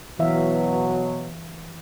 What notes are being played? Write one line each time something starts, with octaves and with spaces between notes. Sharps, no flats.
B2 E3 F#3 E5 F5